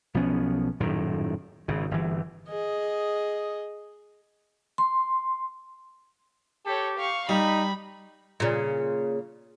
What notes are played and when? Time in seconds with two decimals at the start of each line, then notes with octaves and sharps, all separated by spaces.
0.14 B1 F3 B3 C#4
0.80 D#1 F#2 A2 D#3
1.68 G#1 C#3
1.91 G1 E3
2.49 G#4 D#5
4.78 C6
6.66 G4 A4 C#5
6.99 F5 C#6
7.29 G3 D#4 B5
8.40 A#2 C#3